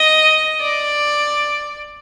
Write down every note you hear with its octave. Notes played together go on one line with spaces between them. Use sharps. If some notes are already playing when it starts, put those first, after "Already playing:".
Already playing: D#5
D5